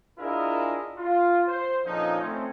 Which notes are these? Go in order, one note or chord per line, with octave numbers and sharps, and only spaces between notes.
D4 E4 F4 G#4 A#4 D#5
F4
C5
A#2 D3 F3 C#4 D#4
A3 C4 C#4